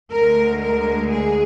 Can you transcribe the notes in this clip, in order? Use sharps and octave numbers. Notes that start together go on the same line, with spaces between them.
D2 D3 G#3 A#4
A#4
G#4